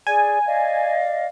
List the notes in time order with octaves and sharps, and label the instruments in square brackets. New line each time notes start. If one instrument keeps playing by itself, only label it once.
[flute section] G#4 D5 [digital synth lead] G#5
[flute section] D5 D#5 F5